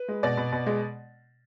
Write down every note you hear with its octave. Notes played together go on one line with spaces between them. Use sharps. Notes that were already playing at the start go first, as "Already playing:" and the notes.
Already playing: B4
G#3
B2 D5
B2
B2
G#3